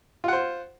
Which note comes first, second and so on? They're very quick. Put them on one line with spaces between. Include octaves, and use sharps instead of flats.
F4 F#5 C5